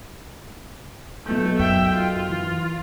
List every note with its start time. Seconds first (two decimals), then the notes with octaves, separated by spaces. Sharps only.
1.26 B1 A3 B3 G6
1.59 F#2 E5 G5
1.95 F4
2.29 E3